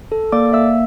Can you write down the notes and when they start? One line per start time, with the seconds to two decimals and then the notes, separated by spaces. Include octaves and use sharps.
0.12 A4
0.32 A#3 D5 D6
0.53 A#3 E5 E6